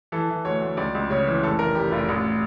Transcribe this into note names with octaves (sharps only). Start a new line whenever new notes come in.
E3 A4
E3
D2 C#5
D2
C#2 D5
C#2
C#3 C#5
E3
F1 A4
F1 A#4
F1 G4
F1 F4
A1